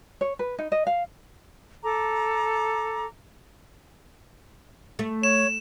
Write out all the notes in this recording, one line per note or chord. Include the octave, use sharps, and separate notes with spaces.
C#5
B4
D#4
D#5
F5
A4 A#5 D6
A3
C#5 E7